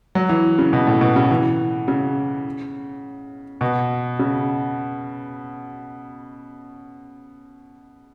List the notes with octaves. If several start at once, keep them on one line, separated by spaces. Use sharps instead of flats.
F#3
E3
C#3
B2
A2
B2
C#3
E3
C#3
B2
C#3